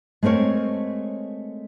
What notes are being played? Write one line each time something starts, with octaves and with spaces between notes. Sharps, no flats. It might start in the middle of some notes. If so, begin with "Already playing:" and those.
G#3 A3 C4 A#4 C#5